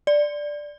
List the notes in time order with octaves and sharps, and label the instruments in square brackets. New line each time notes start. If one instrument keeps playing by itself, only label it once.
[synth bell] D5